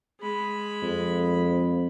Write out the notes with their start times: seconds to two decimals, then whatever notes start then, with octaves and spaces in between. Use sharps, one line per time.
0.21 G#3 B5
0.83 F2